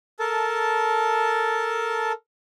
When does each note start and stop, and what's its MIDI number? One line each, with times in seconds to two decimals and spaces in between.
0.19 2.12 69
0.19 2.12 70
0.19 2.12 81